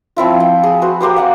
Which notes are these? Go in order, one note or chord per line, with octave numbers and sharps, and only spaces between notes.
F3 C4 E4 F4
G5
G#4
F#4 C5
A#3 G4 C5 D#6
F5 F#5 G#5